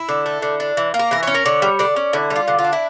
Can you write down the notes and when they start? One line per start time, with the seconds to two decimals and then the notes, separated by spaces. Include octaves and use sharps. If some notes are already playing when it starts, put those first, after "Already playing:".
Already playing: E4
0.09 D3
0.26 A3
0.42 D3
0.60 D4
0.77 E3
0.94 A#3
0.99 A#4
1.11 E3 A#4
1.23 C#4 C#5
1.35 A#4
1.45 D3 C#5
1.62 G3
1.79 D3 D5
1.96 C#4
2.13 D3 E4
2.30 G3
2.36 F4
2.48 D3
2.59 F4
2.64 D4
2.73 E4